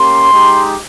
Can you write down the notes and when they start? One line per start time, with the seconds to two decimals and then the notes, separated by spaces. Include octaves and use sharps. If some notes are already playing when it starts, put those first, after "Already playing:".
Already playing: A#3 C#4 G4 C6
0.32 G#3 D#4 G4